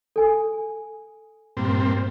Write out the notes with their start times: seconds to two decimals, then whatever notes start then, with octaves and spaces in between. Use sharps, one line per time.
0.16 A4 G#5
1.57 G2 A#2 C4